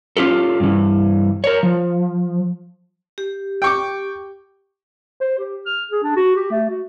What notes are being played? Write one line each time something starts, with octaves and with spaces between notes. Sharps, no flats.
C#4 F4 G4 A4
G2 E3
A#4 C#5
F3
G4
G5 C#6 D6
C5
G4
F6
G#4
D4
F#4
G4
A3
F#4